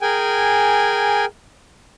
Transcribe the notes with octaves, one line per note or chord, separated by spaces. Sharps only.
G#4 A#4 G5 G#5